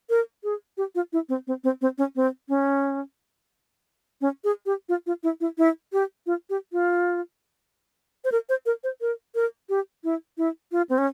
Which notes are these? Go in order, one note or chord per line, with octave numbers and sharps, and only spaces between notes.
A#4
G#4
G4
F4
E4
C4
C4
C4
C4
C#4
C4
C#4
C#4
G#4
G4
F4
F4
E4
E4
E4
G4
F4
G4
F4
C5
A#4
C5
A#4
C5
A#4
A#4
G4
E4
E4
F4
C4
C#4